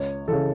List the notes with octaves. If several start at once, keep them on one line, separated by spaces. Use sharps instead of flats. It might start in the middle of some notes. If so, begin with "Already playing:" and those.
Already playing: C#2 C#5
C#3 E3 A4